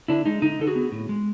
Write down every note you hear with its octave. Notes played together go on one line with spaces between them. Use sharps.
D3 D4 E4
G#3 D#4
D3 D#4
D3 A4
F#4 G#4
B3
A2
G#3